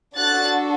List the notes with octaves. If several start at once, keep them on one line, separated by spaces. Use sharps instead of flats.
D4 F#4 A4 F#6 A6